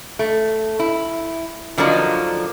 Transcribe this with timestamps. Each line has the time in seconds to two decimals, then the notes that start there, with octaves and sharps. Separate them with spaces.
0.19 A3
0.79 E4
1.77 D3 F3 F#3 A#3 D4 D#4